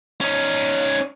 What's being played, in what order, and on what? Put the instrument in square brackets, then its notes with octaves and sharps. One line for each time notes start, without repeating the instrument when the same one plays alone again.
[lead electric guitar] C#4 D#4